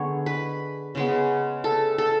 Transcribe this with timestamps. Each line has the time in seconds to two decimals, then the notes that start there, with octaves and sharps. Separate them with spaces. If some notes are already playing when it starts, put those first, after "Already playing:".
Already playing: D3 G#3 B3 C#5
0.26 B4
0.95 C#3 G#3 B3
1.64 A4
1.98 A4